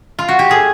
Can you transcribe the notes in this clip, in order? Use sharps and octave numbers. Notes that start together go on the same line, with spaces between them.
F4
F#4
G4
A2 G#4